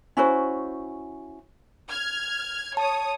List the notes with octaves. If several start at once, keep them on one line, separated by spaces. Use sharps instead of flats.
C#4 E4 F#4 C5
F6 G#6
C#5 A5 D#6